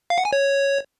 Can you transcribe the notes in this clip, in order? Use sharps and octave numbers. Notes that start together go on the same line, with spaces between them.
F5
F#5
G#5
C#5